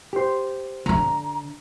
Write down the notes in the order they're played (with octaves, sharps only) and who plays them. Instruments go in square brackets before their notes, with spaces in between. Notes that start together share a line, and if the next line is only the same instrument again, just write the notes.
[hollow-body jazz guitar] G4 C5
[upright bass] D3 D4 [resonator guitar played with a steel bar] A#5